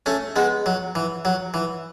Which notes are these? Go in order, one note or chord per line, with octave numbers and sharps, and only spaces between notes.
A3 C#4
G#3 B3
F#3
E3
F#3
E3